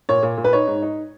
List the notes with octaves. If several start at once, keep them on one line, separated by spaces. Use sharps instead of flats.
A#2 C#5
A#2
A#2
B4
D#4 C#5
G#2
D#4